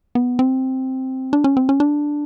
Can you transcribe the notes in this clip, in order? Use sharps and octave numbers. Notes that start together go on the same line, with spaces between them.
B3
C4
D4
C#4
C4
C#4
D4